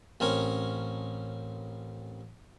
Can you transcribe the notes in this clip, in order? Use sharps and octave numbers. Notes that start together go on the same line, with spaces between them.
A1 C4 C#4 A#4 C#5